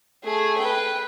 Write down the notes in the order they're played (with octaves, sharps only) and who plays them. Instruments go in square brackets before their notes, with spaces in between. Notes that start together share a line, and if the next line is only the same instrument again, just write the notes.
[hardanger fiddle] A3 G#4
B4 G5